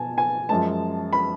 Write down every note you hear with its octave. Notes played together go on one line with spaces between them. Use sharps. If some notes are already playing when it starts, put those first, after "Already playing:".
Already playing: B2 G#5 A5
G#5
F#2 F3 G#3 A5
B5